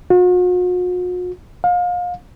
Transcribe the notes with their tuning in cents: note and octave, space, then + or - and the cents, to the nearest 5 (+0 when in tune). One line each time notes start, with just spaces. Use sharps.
F#4 -45
F5 +30